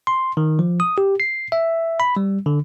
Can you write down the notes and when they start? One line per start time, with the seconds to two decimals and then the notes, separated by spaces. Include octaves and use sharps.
0.07 C6
0.37 D#3
0.59 F3
0.80 D#6
0.98 G4
1.20 C7
1.52 E5
2.00 B5
2.17 G3
2.46 D3